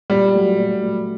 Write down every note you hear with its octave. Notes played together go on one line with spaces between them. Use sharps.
A#2 G3
F#3 A3
A#2
F#3 A3